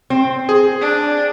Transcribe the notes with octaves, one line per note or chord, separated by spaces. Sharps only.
C4
G#4
D4